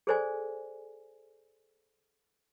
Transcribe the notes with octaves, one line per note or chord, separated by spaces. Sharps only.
G#4 A4 C5 D5 G#5